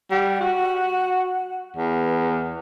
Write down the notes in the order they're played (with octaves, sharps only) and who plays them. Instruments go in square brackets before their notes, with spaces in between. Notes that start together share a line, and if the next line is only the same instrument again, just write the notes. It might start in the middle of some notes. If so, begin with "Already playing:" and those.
[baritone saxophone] G3 [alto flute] F#5
[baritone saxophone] F#4
[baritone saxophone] E2 [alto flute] B4